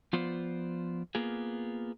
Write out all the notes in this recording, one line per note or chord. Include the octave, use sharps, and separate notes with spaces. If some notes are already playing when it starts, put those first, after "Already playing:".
F3 B3 F4 C5 D5
A#3 B3 F4 G#4